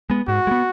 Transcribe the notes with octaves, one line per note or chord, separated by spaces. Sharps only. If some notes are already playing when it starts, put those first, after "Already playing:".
G#3 B3
G#2 F#4
G#3
B3